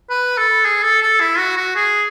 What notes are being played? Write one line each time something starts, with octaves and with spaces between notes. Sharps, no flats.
B4
A4
G#4
A4
A4
E4
F#4
F#4
G#4